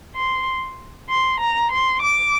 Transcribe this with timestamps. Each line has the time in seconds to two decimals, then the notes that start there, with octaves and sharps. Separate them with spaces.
0.16 C6
1.09 C6
1.40 A#5
1.72 C6
2.02 D6